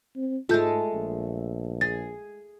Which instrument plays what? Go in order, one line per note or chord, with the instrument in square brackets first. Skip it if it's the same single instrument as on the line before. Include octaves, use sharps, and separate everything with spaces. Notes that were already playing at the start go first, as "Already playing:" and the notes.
[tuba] C4
[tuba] G#2 [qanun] G#3 A3 A4 [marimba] F4 G6
[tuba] A#1
[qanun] G#4 [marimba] A6